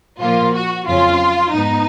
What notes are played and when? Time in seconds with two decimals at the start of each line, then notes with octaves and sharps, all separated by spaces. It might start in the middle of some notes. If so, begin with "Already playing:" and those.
0.21 A#2 F3 A#3 F4
0.54 F#4
0.87 F2 C#3 F#3 C#4 F4
1.52 G#2 F3 B3 D#4